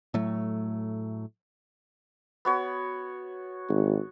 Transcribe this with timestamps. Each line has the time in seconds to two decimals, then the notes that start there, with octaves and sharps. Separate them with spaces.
0.14 A2 F#3 A3
2.45 B3 F#4 C#5
3.69 G#1